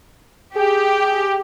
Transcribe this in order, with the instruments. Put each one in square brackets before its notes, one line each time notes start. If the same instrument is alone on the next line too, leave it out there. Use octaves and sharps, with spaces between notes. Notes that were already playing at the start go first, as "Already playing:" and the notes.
[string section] G4 [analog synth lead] G#4